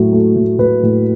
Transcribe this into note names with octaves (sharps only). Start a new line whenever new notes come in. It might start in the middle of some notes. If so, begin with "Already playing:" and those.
Already playing: A2 F#3
A3
A2
A2 B4
A2